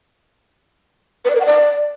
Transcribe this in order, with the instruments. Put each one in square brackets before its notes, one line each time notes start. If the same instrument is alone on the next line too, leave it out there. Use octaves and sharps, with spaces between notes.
[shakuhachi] B4
D5
A#4
F#5
D5